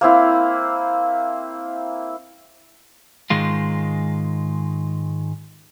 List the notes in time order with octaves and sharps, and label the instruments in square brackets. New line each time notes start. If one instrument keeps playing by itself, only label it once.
[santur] A#3 C4 E4
[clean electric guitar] G#2 D#3 G#3 F4